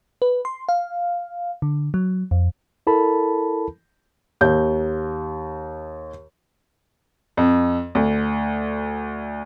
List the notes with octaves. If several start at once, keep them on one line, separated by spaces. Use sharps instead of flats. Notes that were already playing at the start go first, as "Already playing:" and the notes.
B4
C6
F5
D3
F#3
F2
E4 A4 A#4 A5 B5
D#2 G6
F2
D2